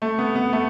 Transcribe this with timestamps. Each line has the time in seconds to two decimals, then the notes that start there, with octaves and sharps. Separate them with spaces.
0.02 A3
0.18 B3
0.35 B3
0.53 A3